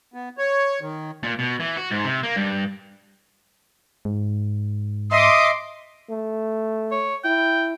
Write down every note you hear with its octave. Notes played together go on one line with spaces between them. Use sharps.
B3
C#5
D#3
A#2
B2
E3
F#4
G#2
C3
A#3
G2
G#2
D#5 E5 C6 D6 D#6
A3
C#5
E4 G5